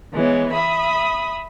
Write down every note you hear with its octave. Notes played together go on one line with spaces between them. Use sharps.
E3 G#3 B3 C#5
E5 B5 D#6